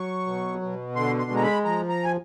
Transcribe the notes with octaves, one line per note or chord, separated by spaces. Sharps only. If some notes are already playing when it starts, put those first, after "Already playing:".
Already playing: F#3 C#6
B2
B2
D3 C6
C6
G#3
A#5
B5
F3 A#5
A#5
G#5